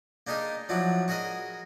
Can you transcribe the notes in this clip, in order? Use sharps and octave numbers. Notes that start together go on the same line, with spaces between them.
A#3 D4 D#4 G4 G#4 A#4
F3 F#3 D4 E4 F#4
F#4 G#4 A#4 B4 D#5